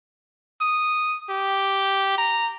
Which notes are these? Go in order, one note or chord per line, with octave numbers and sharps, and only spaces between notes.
D#6
G4
A#5